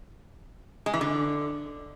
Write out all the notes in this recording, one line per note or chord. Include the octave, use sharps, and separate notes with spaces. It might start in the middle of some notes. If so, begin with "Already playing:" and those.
G#3
E3
D3